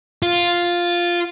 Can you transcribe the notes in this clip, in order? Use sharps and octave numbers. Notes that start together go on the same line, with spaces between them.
F4